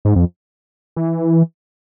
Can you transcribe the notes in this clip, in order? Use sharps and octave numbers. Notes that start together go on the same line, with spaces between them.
G#2
F2
E3